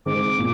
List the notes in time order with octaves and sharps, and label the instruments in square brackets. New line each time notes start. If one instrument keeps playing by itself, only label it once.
[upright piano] D#3 G#3 C4 [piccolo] D6
[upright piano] A#2